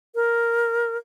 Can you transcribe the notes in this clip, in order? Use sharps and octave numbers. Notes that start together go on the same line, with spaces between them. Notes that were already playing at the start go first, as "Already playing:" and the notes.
A#4